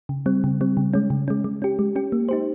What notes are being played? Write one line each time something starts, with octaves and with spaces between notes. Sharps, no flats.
C#3
G3 C4
C#3
G3 C4
C#3
G#3 C#4
C#3
G#3 C#4
G#3
C#4 G4
G#3
C#4 G4
A#3
D#4 G4 C5